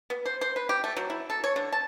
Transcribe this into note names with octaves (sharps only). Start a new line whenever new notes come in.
B3
C5
C5
B4
G4
A3
F#3
E4
A4
C#5
D3
A5